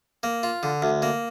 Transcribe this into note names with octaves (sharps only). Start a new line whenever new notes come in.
A#3
F4
D3
D2
A#3